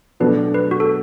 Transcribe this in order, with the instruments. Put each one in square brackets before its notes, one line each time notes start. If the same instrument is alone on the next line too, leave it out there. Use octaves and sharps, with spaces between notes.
[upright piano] B2 F#3 A3 D4 [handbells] B4
[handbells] B4
F#4
A4